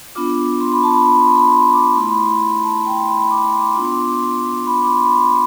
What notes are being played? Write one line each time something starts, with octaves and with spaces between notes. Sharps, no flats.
B3 D4 F4 D6
C6
B5
A5
B5
B5
C6
B5
C6
D6
A3 E4 C6
B5
C6
A5
G5
C6
B5
B5
D6
C6
D6
C6
B3 D4 F4 D6
C6
D6
C6
D6
C6
B5
D6
C6
B5
C6